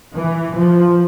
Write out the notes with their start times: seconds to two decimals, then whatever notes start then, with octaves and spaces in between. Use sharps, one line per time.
0.16 E3
0.56 F3